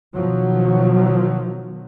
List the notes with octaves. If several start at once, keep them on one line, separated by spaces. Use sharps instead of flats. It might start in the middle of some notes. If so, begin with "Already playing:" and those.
B2 D#3 F3 F#3